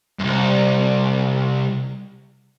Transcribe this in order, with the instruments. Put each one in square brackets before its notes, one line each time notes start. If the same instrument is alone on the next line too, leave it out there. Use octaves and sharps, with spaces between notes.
[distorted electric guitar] C2 F#2